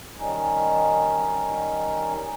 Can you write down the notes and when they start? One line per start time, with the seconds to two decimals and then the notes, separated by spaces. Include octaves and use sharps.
0.19 D#3 G3 C#4 D#4